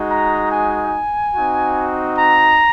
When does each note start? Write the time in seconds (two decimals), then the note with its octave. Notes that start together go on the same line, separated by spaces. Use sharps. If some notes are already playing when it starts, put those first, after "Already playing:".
Already playing: G#3 D#4 F#4
0.11 A#5
0.52 G#5
1.35 C4 D#4 F#4
2.18 A#5